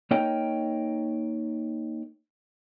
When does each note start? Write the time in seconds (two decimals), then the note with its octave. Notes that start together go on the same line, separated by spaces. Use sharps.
0.11 A#3 D#4 A#4 C#5 D#5 G5